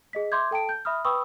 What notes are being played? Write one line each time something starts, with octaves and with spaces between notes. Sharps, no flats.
G#4 D#5 B6
E5 C6 D6 G6 G#6
A4 G5 A5 D7
G6
E5 B5 D#6 F6
B4 G5 B5 C#6 D#6 E6